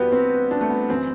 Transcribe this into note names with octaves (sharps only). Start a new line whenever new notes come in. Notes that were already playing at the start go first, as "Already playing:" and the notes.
Already playing: A1 G2 E3 B3 F#4 G4 B4
C4
D4
A3
B3
F#2 E3 C4